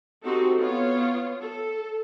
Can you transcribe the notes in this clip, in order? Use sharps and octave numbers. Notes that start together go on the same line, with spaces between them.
C4 D#4 F#4 G4 A4
B3 F4 C#5
A4